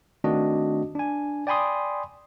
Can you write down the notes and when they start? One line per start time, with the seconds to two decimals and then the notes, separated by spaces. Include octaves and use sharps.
0.24 D#3 A3 C4 D4 F#4 D#5
0.95 D4 G#5
1.47 D5 G5 G#5 B5 C6 D#6